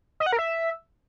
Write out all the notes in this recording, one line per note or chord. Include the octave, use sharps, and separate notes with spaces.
D#5
F#5
A#4
E5